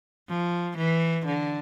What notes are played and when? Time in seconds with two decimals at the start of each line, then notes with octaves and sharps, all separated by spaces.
0.29 F3
0.77 E3
1.26 D3